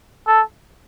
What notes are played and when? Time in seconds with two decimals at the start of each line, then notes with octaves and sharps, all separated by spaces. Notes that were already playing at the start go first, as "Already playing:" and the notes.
0.27 A4